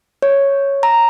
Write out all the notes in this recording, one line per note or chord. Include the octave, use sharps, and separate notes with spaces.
C#5
A#5